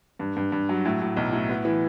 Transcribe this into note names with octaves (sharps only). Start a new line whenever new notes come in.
G2
G2
G2
F#3
A2
A2
B1
A2
B3
E3